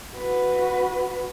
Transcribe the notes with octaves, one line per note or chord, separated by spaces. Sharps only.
F#4 B4